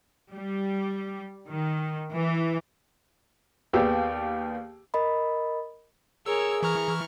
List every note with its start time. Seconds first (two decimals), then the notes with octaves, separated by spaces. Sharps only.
0.32 G3
1.49 D#3
2.14 E3
3.73 D#2 B3 G4 G#4 D5 E6
4.94 A#4 D#5 B5
6.26 G#4 A#4 C#5 E6
6.63 E3 A#5 C#6 F6